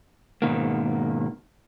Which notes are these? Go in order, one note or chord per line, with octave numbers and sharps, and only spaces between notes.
G#2 B2 D#3 A#3